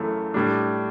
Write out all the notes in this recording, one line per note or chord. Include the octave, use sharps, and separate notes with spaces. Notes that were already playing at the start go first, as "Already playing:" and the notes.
Already playing: F#2 C#3 E3 A3
A2 G3 D4